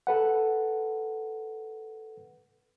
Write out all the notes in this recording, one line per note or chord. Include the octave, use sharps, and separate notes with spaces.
A4 B4 F#5